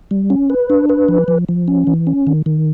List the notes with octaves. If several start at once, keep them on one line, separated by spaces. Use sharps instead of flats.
G3
C#4
B4
D4
B4
F3
F3
F3
C#4
E3
C#4
D#3
D#3